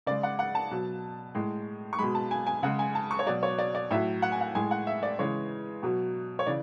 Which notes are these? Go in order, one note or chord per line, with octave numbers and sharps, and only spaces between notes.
C#3 G#3 D5
F#5
F#5
A5
B2 F#3
A2 G#3
C#6
B2 G#3 B5
A5
G#5
G#5
C#3 G#3 F#5
G#5
A5
C#6
C#5
B2 F#3 D5
C#5
D5
D5
A2 F#3 E5
F#5
G#5
F#5
A2 G#3 G#5
F#5
E5
D5
C#3 E3 G#3 C#5
B2 F#3
C#5
C#3 E3 D5